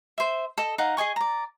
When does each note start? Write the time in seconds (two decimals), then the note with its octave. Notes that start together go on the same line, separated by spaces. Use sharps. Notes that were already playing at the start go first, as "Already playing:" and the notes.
0.18 C5 E5
0.58 A4 D#5
0.78 D#4 F5 F#5
0.97 G#4 D#5 G#5 C#6
1.16 D5 A#5